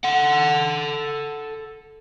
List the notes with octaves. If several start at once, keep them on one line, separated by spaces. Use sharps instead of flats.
A4 F#5